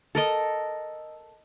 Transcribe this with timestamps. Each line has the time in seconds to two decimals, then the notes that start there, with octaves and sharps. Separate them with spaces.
0.15 A4 A#4 D#5